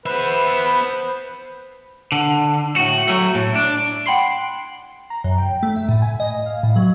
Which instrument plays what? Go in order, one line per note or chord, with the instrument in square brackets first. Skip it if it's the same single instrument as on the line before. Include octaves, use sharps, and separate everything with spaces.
[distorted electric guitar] B3 E5 [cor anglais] B4 [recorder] C5 [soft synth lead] B5
[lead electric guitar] D3
A2 F#4
F#3 A3
A2
D4
[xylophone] F#5 G5 B5 C6 C7
[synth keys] A#5
F#2
G5
A3
E5
A2
G#5
D#5
F5
A2
F#3